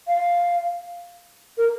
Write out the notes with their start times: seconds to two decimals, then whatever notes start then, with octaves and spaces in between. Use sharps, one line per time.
0.07 F5
1.58 A#4